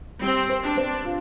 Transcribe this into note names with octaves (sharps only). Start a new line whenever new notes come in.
G3 C4
C5
D4
C4
F4